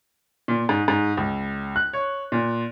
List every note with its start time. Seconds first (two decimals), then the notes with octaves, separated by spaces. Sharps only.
0.48 A#2
0.69 G#2
0.88 G#2
1.17 C#2
1.76 F#6
1.93 C#5
2.32 A#2